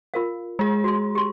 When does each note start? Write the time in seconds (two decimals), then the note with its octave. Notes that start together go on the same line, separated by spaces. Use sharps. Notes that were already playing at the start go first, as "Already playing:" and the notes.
0.14 F4 A#4 F5
0.59 G#3 G#4
0.84 F#4 C6
1.15 G4 C6